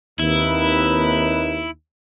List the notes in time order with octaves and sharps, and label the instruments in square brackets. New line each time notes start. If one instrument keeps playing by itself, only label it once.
[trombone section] D#2 [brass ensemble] C4 D#4 B4 [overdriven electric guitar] E4